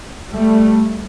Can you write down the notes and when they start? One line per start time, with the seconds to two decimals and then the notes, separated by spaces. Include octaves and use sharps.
0.33 G3 A3